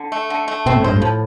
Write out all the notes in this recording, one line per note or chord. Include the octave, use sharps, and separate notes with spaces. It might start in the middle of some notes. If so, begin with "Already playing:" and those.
Already playing: D3
A3
D3
A3
B2 C4
A2
G2 C5
A2
F3